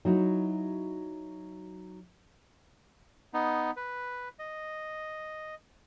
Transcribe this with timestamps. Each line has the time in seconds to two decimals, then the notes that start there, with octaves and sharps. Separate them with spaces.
0.05 F#3 D#4 E4 F#4
3.34 B3 D#4
3.77 B4
4.39 D#5